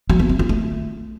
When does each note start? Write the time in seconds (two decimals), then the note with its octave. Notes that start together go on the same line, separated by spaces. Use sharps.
0.10 F#3
0.19 B3
0.29 C4
0.39 F4
0.49 A3